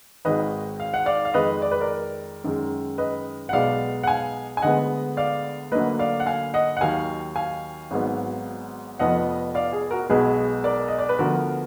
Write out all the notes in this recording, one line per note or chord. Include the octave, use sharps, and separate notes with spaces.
G#1 G#2 D#3 G#3 B4 D#5
F5
F#5
D5 F5
F5
F2 D#3 G#3 B4 D#5
D5
B4
A#4 D5
F#2 D#3 G#3
B4 D#5
F#5
B1 B2 G#3 B3 D5 F5
F#5
F5 G#5
G#5
D2 D3 G#3 B3 D#5 F#5
D5 F5
D2 D3 F#3 A#3 B4 D#5
D5 F5
F#5
F5 G#5
D#5 F#5
F#5
D#2 D#3 F#3 F5 G#5
F5 G#5
G#1 G#2 F#3 B3
F1 F2 F3 B3 D#5 F#5
D5 F5
G#4
F#4 A#4
B1 B2 G#3 B3 G#4 B4
A#4 D5
D#5
D5
B4
D2 D3 F3 B3 F#4 A#4